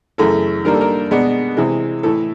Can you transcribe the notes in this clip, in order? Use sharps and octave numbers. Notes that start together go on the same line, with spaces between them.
F#2 C#3 E3 A3 A4
D#3 G3 A#3 D4 A#4
A4
A#4
B2 G#3 B3 D4
C3 E3 G#3
A2 E3 A3 A4